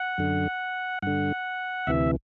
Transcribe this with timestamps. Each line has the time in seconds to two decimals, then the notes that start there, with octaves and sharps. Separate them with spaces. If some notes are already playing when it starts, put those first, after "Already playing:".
Already playing: F#5
0.18 F#2 D3
1.02 G2 D3 F#5
1.87 D2 C3 E3 E5